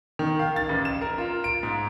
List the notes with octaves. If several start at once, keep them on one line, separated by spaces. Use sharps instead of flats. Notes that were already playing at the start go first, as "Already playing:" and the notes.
D#3
F5
A6
A1
E7
A#4
F4
D7
G#2